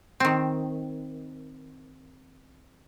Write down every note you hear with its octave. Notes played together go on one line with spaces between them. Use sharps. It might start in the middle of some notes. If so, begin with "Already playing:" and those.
D#3 C4